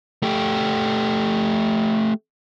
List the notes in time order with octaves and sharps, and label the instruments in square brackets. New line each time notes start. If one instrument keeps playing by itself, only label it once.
[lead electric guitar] A3 G4